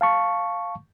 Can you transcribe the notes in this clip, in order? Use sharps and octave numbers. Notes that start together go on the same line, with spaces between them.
F5 A5 C#6